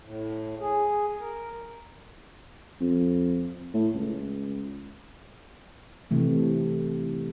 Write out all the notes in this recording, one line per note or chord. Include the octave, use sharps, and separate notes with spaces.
A2
G#4
A#4
F2
A2
C#2
C3 E3 A3